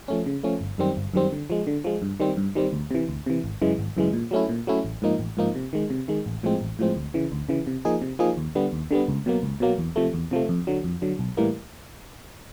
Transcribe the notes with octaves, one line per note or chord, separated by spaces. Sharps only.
F3 A3 C#4
C#3
F3 A3 C#4
G1
F#2 D#3 G3 C4
G1
F#2 D#3 G3 C4
D3
F3 G#3
D3
F3 G#3
G2
D#3 G3 C4
G2
D#3 G3 C4
D2
C3 E3
D2
C3 E3
G#1
F#2 C#3 E3 G#3
G#1
F#2 C#3 E3 G#3
A#2
F#3 A3 C#4 E4
A#2
F#3 A3 C#4 E4
A1
G#2 F3 A#3 D#4
A1
G#2 F3 A#3 D#4
C3
D#3 G#3
C3
D#3 G#3
A1
A2 F3 G#3 C4
A1
A2 F3 G#3 C4
D2
C#3 E3
D2
C#3 E3
C3
F3 A#3 D#4 G#4
C3
F3 A#3 D#4 G#4
D#2
D3 G3 B3
D#2
D3 G3 B3
C#2
B2 F#3 A#3
C#2
B2 F#3 A#3
E2
C3 F3 A3
E2
C3 F3 A3
F2
D3 F#3
F2
D3 F#3
B1
A2 E3 G3 A#3